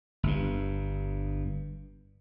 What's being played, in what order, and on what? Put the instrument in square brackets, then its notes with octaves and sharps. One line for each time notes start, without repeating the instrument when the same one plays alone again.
[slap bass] G1 G2